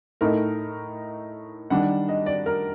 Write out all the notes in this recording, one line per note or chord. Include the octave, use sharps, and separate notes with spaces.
A2 A3 D#4 A#4
D#3 G3 D4 F#5
D#5
D5
A#4